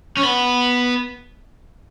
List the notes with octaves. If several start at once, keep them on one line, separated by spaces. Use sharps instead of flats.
C#4
B3